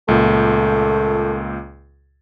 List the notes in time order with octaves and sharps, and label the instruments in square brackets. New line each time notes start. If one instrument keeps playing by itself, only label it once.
[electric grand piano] C#2 A#2 [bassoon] A3